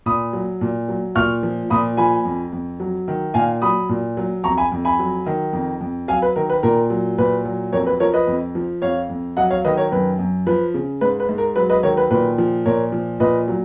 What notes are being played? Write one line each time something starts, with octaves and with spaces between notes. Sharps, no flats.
A#2 B5 D#6
F#3
A#2
F#3
A#2 C#6 F6
F3
A#2 B5 D#6
F3 G#5 B5
F2
F2
F#3
D#3
A#2 F5 G#5
F#3 B5 D#6
A#2
F#3
F2 A#5 C#6
G#5 B5
F2
G#5 B5
F#3
D#3
F2
F2
F#3 F5 G#5
B4
D#3 A#4
B4
A#2 A#4
F#3
A#2 B4
F#3
F2 A#4 C#5
B4
F3 A#4 C#5
B4 D#5
F2
F3
F2 C#5 F5
F2
F#3 D#5 F#5
C#5 F5
D#3 B4 D#5
A#4 C#5
F#2 B4
F#2
F3 B4
C#3
G#2 B4
B4
G#2
A#4
F#3 B4
B4 D#5
D#3 A#4 C#5
B4
A#2 B4
F3
A#2 A#4 C#5
F3
A#2 B4 D#5
F#3